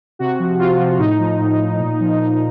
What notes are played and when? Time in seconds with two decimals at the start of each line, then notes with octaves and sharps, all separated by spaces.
0.19 C3 F#4
0.40 F3
0.59 C3 F4
0.79 F3
0.99 A2 D#4
1.19 F3
1.40 A2
1.60 F3
1.79 A#2
2.00 F3
2.19 A#2 D#4